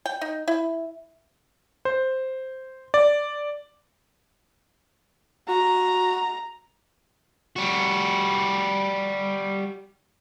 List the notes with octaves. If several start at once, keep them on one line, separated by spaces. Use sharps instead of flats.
G5
D#4
E4
C5
D5
F#4 A#5
G3 F#4